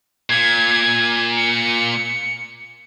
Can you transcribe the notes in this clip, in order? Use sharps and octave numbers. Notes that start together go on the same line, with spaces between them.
A#2 G#6
C#7